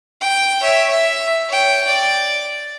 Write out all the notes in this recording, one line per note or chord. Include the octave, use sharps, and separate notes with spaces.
G5
C#5 E5
E5
C#5 G5
D5